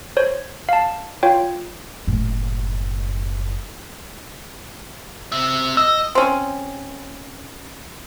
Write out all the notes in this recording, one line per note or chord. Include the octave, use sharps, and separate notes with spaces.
C5 C#5
F5 A5
F4 C#5 F5 G5
F#1 A2
C4 E5
D#5 E6
C4 C#4